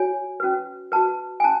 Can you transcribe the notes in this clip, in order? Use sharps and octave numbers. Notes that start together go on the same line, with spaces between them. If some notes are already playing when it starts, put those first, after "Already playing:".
Already playing: F#4 C#5 G#5
C#4 F#4 B4
F#4 B4 A5
G#5
C#4 A5